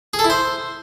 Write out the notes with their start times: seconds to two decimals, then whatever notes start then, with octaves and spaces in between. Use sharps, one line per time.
0.14 G#4
0.19 A4
0.24 E4
0.30 C5